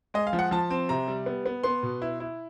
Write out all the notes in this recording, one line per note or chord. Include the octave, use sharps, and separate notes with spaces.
G#3 D#5
F5
F3
F#5
F3 A5
C4
C3 A#5
G3
B3
B3
B3 C6
B2
E4
E4